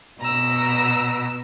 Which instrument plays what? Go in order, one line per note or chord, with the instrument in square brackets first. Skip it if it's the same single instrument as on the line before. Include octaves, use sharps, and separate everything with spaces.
[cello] B2 [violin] A#5 E6